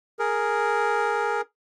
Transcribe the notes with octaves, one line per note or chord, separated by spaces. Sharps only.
G#4 A#4